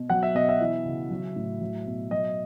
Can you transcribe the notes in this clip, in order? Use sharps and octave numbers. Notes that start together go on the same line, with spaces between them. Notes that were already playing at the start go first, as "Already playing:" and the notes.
Already playing: B2
F#3 F#5
E5
B2 D#5
E5
E3
C#3
F#3
A2
F#3
B2
F#3 D#5